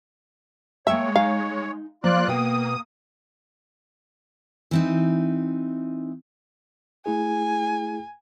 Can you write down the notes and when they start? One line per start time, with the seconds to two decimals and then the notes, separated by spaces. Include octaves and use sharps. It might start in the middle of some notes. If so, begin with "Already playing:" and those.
0.87 G#3 A#3 C#5 E5 G5 A5
1.16 D#4 F5 G#5
2.04 F3 A#3 F4 D5 F#6
2.28 B2 F5 G5 D#6
4.71 E3 C4 D#4
7.06 A3 E4 G#4 G#5